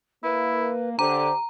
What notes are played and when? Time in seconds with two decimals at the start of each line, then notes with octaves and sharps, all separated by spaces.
0.24 A#3 E4 B4
0.99 D3 G4 C5 A#5